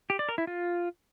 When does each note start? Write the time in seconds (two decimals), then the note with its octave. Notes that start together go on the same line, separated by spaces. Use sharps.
0.10 G4
0.19 D5
0.29 A#4
0.38 E4
0.47 F4